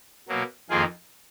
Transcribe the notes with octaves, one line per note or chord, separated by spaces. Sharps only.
B2 F#3 A#3
F2 D#3 A#3 F4 G#4